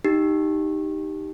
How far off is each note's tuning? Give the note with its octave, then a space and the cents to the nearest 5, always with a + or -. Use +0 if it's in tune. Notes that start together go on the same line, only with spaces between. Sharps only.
D#4 +0 G4 +0